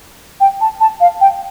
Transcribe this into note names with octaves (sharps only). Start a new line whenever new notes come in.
G5
A5
A5
F5
G5